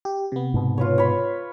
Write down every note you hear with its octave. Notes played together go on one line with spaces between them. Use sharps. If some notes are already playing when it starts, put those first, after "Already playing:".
G4
C3 B3
G#2 B2
F4 B4 C#5
C#5 B5 C6